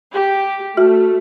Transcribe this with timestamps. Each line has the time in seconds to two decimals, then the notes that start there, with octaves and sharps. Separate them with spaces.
0.14 G4
0.77 A3 F#4 E5 F6